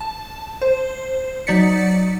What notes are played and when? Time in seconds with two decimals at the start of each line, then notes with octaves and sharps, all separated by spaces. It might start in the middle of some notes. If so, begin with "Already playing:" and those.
0.01 A5
0.62 C5
1.47 F#3 D#4 D5 A6 B6 C#7